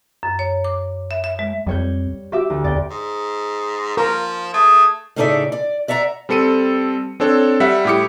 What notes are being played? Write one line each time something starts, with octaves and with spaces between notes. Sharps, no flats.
F#2
C#5
D6
E5
E5
G#3
F2 G3 C#5 G6
F#4 G4 E5 D6
D2
E2 D5 G5
G#2
F3 A#4
A3 G#4
A2 C#3 D#4 A4 D5 E5
D5
D5 E5 F#5 A#5
G3 C4 A4 C#7 D#7
C4 D4 A4 C#5
G3 E5 F#5
A2 E4 G4 D6 C#7